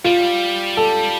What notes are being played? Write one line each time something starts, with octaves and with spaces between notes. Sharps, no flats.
G3 F4
A4